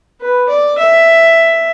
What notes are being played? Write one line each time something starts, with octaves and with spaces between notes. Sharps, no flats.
B4
D5
E5